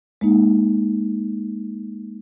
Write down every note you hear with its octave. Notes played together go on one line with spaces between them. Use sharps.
G#3 A#3 D#4